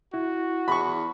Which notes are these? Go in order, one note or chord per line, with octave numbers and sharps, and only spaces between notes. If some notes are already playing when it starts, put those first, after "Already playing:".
E4 F#4
E2 B5 C#6